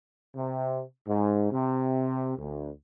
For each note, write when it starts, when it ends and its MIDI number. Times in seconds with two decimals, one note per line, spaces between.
0.34 0.81 48
1.06 1.48 44
1.51 2.33 48
2.37 2.69 38